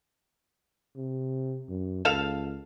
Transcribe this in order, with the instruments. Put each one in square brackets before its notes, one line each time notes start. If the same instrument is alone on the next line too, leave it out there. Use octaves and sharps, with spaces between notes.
[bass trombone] C3
F#2
[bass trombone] C#2 [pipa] A4 F5